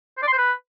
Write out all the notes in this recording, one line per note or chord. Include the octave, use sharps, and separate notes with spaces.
C5
D5
C6
C5
B4